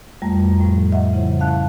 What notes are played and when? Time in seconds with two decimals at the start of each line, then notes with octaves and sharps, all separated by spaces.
0.22 F2 G3 A3 A#5
0.61 A2 F3
0.92 D#5 E5 F#5
1.13 C#3 F3 E4 C5
1.40 C#4 F5 A5 F#6